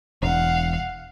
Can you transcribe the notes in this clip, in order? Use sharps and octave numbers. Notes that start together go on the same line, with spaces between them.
E1 F5 F#5